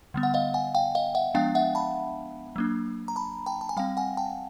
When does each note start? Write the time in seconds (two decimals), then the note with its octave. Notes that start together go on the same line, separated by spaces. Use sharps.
0.14 D3 G3 B3
0.23 F#5
0.34 D#5 F5
0.54 F#5 G#5
0.75 F5 G5
0.95 D#5 F5
1.15 E5 F#5
1.34 F3 G#3 B3 D4 F5 G5
1.55 E5 F#5
1.75 A5 B5
2.56 F#3 A#3 D4
3.08 A#5
3.16 A5 B5
3.46 G5 A5
3.61 A5
3.69 G#5
3.77 G3 C4 F5 G5
3.97 F#5 G#5
4.17 G5 A5